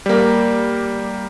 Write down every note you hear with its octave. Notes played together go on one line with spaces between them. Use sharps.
G3 A#3